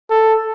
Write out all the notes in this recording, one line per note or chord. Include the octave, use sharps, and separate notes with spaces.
A4